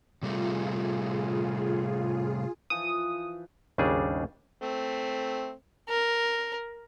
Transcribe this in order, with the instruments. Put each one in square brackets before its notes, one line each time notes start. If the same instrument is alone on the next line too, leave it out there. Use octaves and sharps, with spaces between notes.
[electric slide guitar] C3 G3 A3 [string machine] F4 G#4
[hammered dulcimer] E3 F3 [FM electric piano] D#6
[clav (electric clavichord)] G#1 D#2 C#3 G3 D4 G#4
[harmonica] A3 C4
[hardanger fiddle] A#4